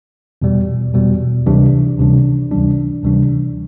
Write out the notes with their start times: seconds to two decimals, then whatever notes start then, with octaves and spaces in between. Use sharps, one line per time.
0.42 E2 B2 G3
0.94 E2 B2 G3
1.47 D2 C3 E3 G3 D4
1.99 D2 C3 E3 G3 D4
2.51 D2 C3 E3 G3 D4
3.03 D2 C3 E3 G3 D4